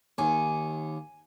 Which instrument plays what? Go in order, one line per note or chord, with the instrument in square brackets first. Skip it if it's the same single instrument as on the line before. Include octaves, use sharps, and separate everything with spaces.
[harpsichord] D#2 [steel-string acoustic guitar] G#5